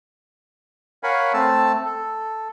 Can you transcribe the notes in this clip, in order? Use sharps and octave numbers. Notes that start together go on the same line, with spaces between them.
A#4 C#5 F5 F#5 G#5 B5
A3 C4 A5 E6
A4